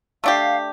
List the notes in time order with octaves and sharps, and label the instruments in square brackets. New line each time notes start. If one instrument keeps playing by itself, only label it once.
[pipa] A3 D4 G4 [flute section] F5